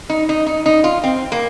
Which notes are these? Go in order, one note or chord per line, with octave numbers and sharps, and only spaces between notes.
D#4
D#4
D#4
D#4
F4
C4
A#3